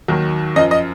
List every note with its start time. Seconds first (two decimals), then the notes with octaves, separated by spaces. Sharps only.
0.08 D#2 D#3 F#3
0.56 F#2 F3 D#5
0.71 D#5